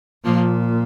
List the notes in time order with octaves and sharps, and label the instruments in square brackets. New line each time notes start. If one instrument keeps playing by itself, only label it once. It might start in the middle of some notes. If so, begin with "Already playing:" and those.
[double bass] A#2 [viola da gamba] F3 A#3